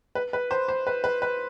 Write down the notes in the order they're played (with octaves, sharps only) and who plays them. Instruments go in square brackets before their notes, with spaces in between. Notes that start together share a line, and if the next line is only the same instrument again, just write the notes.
[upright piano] B4
B4
C5
C5
B4
B4
B4